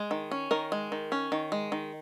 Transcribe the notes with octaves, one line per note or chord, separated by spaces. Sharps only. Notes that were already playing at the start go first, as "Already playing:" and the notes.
Already playing: G#3
D#3
C#4
D#3 A#4
G#3
D#3
C#4
D#3
G#3
D#3